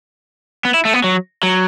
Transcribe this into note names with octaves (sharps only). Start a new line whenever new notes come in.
B3
E4
A3
B3
F#3
F#3